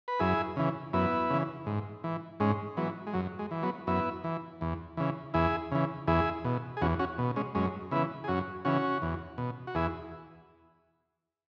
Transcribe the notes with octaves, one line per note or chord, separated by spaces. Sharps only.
B4
F#2 E4 G#4
C#3 E3
F#2 B3 E4
C#3 E3
G#2
E3
G#2 G#3 C#4
E3 F#3 B3
G#3
F#2 F#3
G#3
E3
F#3 B3
F#2 B3 E4
E3
E2
C#3 E3
E2 E4 G#4
C#3 E3
E2 E4 G#4
B2
G#4
E2 C#4 F#4
C#4 F#4
B2
G#3 C#4
F#2 G#3 C#4
C#3 E3 B3 E4
G#4
F#2 C#4 F#4
C#3 E3 C#4 F#4
E2
B2
F#4
E2 E4 G#4